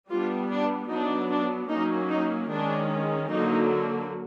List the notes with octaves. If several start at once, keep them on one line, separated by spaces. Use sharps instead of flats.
G3 B3 D4 F4
D4
F#3 B3 D4 D#4
D4
F#3 A#3 C#4 D#4
D#4
D#3 G#3 C#4 D4
D3 F#3 A#3 D#4